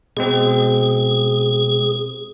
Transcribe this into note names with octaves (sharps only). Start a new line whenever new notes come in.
B2 G#3 C4 G#4